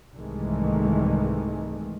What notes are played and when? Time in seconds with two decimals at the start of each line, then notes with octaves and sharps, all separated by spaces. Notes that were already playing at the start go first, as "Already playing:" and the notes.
0.14 C2 G#2 D#3 E3 G#3 A3